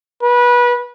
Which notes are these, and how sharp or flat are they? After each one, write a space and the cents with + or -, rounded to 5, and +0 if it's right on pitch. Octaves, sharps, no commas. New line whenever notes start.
B4 -25